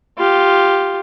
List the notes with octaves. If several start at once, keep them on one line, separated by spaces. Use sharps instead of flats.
F4 G4